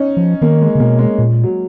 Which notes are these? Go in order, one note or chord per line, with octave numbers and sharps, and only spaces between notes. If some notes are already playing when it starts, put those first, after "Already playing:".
Already playing: C#4 D#4
F3
D#3 A#3
G#3
C#3
B2 A#3
G#3
A#2
F#3